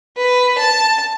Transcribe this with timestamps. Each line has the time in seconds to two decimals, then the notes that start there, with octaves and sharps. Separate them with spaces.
0.17 B4
0.58 A5